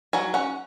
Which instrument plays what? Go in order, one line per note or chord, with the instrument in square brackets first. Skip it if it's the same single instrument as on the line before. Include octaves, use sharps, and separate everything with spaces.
[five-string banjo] F#3 G#5
C#4 F#5